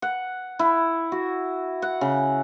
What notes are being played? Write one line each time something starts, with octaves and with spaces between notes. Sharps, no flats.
F#5
E4
F#4
F#5
C#3